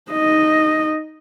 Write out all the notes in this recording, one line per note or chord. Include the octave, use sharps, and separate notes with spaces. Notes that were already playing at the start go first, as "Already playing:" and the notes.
D#4 D#5